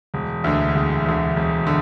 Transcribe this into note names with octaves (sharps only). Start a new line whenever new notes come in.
E1
D2 D3
E1
D2 D3
E1
D3